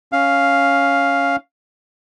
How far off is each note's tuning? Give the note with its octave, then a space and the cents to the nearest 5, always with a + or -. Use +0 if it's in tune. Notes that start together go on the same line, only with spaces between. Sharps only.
C#4 +0 F5 +0